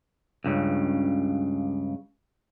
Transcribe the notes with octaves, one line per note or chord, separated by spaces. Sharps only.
C#2 G2 C#3